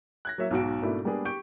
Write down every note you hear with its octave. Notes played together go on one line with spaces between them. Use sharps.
F#6 G#6 A#6
F#3 A#3 C#5 E5
B1 G#2 F#4 D7
G#2 B2 A3 A#3 D4 E4
G3 G#3 A#3 B3 D4 G#4
G4 C#6 G6 D7